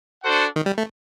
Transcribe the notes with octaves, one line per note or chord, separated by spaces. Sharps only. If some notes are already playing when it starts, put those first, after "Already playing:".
D4 F#4 A4 C5 F#5
D#3
G3
A3